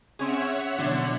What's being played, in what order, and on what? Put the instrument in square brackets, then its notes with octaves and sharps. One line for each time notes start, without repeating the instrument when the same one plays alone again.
[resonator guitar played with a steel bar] C4 C#4 G#4 [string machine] C#5 E5 F#5
[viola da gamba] B2 F3 F#3 [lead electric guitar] D3